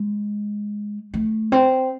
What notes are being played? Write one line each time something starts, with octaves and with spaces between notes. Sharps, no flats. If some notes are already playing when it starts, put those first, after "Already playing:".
Already playing: G#3
A3
C4